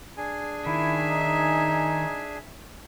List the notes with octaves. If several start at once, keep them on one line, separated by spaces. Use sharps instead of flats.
D4 G#4 G#5
D#3 E4 E5
D#4